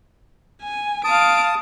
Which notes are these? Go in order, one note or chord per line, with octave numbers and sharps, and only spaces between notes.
G#5
F5 A5 D#6 D7